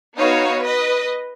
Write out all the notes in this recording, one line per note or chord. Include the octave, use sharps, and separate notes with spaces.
B3 D#4 F#4 C#5 F5
B4 D#5